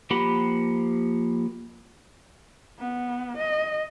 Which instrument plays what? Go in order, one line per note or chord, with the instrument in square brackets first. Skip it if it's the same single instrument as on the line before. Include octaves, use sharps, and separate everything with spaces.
[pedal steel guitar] F3 A#3 G4 F#5 B5
[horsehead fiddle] B3
D#5